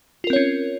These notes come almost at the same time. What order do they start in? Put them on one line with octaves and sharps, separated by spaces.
F4 A#4 C4 C#5 C#4